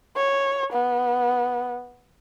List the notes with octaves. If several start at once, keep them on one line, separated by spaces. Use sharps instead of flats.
C#5
B3